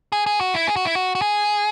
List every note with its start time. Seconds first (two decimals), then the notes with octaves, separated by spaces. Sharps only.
0.12 G#4
0.26 G#4
0.41 F#4
0.54 E4
0.67 G#4
0.76 F#4
0.85 E4
0.95 F#4
1.15 F#4
1.22 G#4